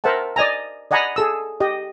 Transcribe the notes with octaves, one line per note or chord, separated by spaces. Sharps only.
A#4 C5 E5 F#5 A5
D5 D#5 G#5 A#5
D5 D#5 F#5 G#5 A#5 B5
G#4 A4 E6
G4 D#5